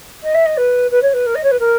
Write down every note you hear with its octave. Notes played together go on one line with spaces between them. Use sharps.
D#5
E5
D#5
B4
B4
C#5
B4
A#4
D#5
C#5
B4
A#4